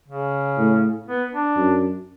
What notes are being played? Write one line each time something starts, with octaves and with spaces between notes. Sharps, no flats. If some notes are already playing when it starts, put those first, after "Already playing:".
C#3
A2
B3
D4
F#2